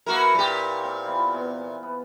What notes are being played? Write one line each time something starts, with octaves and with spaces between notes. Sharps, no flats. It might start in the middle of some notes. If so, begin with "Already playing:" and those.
A#3 E4 F#4 A#4 B4
A#2 G4
C4 F5
E3 B3 F4
C3 B3
B3